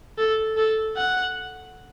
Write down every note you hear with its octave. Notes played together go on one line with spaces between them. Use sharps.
A4
A4
F#5